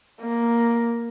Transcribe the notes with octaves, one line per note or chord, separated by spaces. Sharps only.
A#3